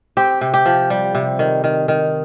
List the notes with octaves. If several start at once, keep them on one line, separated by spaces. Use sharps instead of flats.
C4 G4
C3
G4
F3
G3
C3
D#3
D#3
D#3